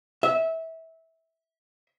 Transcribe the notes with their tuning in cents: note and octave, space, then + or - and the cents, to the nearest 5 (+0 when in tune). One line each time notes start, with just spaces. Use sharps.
E5 -20